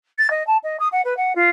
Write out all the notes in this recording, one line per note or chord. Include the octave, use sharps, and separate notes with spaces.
A6
D#5
A5
D#5
D#6
F#5
B4
F#5
F4